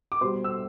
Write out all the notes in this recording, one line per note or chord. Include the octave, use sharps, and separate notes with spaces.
D6
B2 G3 C5 C6
E6